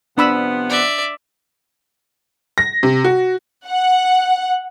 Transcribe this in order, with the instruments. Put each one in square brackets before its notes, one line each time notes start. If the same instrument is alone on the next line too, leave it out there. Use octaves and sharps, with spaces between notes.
[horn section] C3 F3 B3 [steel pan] D4 B5 E6
[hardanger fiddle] D5 E5
[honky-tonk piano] A#6
C3
F#4
[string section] F#5